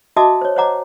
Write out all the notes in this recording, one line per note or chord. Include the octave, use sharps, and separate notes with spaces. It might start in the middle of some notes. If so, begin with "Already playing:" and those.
F#4 D#5 E5 A5 D6 D#6
C5 C#5
C5 C#5 D#5 F#5 A#5 D6